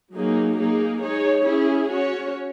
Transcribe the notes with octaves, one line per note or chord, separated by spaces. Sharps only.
F#3 A#3 D#4 G#4
A#3 D#4 G#4
G#3 D#4 G#4 C#5
C#4 E4 G#4
C#4 F#4 C#5